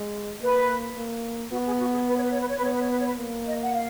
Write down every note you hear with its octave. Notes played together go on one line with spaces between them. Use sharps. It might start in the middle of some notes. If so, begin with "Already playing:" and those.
Already playing: G#3
A#3 B4
A#3
B3 F#4
G#4
F#4
G#4
B4
C#5
B4
C#5
B4
C#5
B4
B3 C#5
B4
C#5
B4
C#5
B4
A#3
D#5
F#5
F5